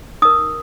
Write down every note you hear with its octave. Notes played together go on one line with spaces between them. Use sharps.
D#4 A#4 D#6